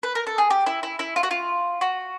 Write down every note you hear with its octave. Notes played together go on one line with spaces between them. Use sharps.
B4
A#4
A4
G#4
G4
E4
E4
E4
F4
F#4
F4
F#4